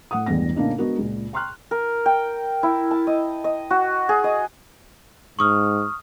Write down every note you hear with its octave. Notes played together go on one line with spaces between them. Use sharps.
A2 F#5 D#6
E1 A1 E2 G2 B3 A#6
A2 C#3 A#3 B3 D4 D#4
G#3 B3 D4 F#4 A#4
C#2 A#2
G5 A#5 C6 C#6 F6 F#6
A#4
G5
E4
A5
D#5
D#5
F#4
G#4
D#5
G#2 C#6 D#6 F6